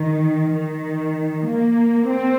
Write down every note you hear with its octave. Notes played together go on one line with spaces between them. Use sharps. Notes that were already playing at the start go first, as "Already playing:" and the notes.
Already playing: D#3
D#3
A#3
C4